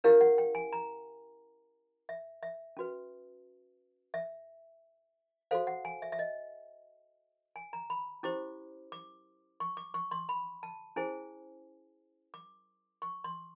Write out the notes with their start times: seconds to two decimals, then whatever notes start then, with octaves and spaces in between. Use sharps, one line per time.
0.04 C#4 E4 G4 A#4 C#5 F5
0.21 F#5
0.38 G5
0.55 G#5
0.73 A#5
2.09 E5
2.43 E5
2.77 C#4 F#4 B4
4.14 E5
5.51 F#4 A4 C5 F5
5.67 F#5
5.85 G#5
6.02 E5
6.12 E5
6.19 D#5
7.56 G#5
7.73 A#5
7.90 B5
8.23 C#4 E4 G4 C5 D6
8.92 D6
9.60 C#6
9.77 D6
9.94 C#6
10.11 C6
10.29 B5
10.63 A5
10.96 C#4 E4 G#4 C5 G#5
12.34 D6
13.02 C#6
13.24 C6